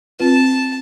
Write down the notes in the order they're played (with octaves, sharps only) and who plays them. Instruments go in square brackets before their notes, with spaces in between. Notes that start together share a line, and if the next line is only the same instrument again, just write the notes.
[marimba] C4 F4 B4 [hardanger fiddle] A5